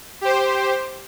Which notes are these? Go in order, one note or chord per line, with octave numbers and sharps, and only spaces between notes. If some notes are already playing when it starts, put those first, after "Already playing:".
G4 C5